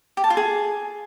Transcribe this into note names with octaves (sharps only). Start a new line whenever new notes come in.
G4
A5
F4
G#4